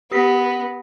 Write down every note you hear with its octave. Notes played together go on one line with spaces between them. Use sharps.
B3 G4 A#6 B6